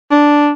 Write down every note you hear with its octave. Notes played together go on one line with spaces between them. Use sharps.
D4